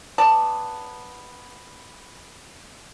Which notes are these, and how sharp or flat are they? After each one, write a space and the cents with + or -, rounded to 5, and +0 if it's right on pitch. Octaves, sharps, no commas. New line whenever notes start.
B3 +0 D5 +0 A5 +5